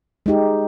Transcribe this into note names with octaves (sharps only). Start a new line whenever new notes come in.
G#3 D#4 G4